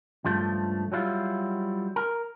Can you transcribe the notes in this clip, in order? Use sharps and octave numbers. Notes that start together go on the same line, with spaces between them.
C#2 G2 F3 A3
F#3 G3 E4 F4
A#4